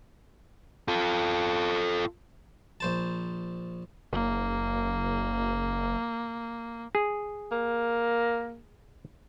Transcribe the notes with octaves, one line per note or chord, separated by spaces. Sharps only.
F4 A4
A#1 C5 A5
F#1 A#3
G#4
A#3